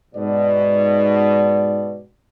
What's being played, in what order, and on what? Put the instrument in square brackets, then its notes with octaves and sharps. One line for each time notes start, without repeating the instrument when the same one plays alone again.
[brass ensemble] G#2 B2 D5